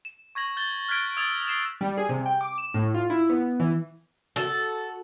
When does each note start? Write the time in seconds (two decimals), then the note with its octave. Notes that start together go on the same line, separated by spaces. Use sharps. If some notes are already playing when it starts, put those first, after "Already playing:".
0.05 E7
0.35 C#6 G#6 A#6 F#7
0.57 G6 A6 G7
0.88 F6 F#6 G#6 B6 D7 G7
1.17 D#6 E6 G#6 A6 F7 F#7
1.47 C7 E7 G7
1.81 G3
1.98 G#4
2.09 C3
2.26 G5
2.41 D6
2.58 E7
2.74 A2
2.94 F4
3.10 E4
3.29 B3
3.60 E3
4.36 F#4 A4